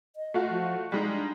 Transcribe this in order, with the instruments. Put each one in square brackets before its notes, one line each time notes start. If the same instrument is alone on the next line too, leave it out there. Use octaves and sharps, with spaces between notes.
[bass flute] D#5
[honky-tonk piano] A3 F4 F#4
[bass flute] F3
[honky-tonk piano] G3 G#3 D#4 [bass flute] G#4
[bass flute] D4